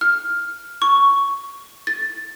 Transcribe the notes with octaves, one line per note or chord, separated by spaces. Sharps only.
F6
C#6
A6